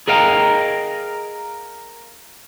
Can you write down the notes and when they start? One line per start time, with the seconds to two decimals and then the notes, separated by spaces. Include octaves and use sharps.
0.08 G#4 A#4 D#5 F5 G5 A#5